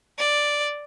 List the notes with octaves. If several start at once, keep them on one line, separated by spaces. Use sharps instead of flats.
D5